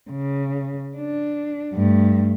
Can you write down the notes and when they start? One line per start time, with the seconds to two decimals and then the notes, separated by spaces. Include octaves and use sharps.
0.11 C#3
0.97 D4
1.73 G2 A3